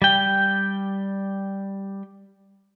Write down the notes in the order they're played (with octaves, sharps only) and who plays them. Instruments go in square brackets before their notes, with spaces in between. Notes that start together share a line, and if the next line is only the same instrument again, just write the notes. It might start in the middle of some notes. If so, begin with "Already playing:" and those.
[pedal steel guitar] G3 G5